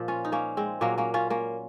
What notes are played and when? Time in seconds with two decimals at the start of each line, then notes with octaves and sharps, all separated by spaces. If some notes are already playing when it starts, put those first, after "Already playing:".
Already playing: A#2 F3
0.08 C#4 F4
0.25 D#4
0.32 A#3 C#4
0.57 G#3 C4
0.81 A#2 F#3 A#3 C#4
0.98 A#3 C#4
1.14 C#4 F4
1.30 A#3 C#4